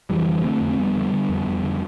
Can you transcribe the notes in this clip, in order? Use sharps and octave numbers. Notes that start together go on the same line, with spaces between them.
F2 E3 G3
D3
D3 A3 C4
F2
C4
F2 G3 B3
D3
D3
F2
F2
D3